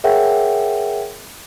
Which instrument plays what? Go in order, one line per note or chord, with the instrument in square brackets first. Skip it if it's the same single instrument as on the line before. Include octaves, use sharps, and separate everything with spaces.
[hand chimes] G#4 A#4 C#5 E5 F#5 G5